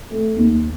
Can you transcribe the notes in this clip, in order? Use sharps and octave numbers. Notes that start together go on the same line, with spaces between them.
A3
D#2